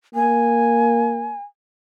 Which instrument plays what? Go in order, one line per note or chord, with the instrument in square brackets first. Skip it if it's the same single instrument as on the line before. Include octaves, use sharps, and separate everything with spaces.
[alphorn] A#3 [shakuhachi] G#5